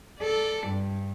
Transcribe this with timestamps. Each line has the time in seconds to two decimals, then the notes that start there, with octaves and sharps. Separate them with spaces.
0.20 A4 D5
0.66 G2